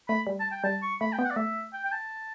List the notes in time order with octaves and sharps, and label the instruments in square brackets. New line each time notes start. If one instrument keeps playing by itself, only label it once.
[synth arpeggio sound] A3 [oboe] B5
[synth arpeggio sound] G3
[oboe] A5
G5
[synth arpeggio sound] G3 [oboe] A5
[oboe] C#6
[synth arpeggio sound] A3 [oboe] B5
[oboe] G5
[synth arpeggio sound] B3
[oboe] F#5
D5
[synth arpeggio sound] A3 [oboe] E5
[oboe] G5
G5
A5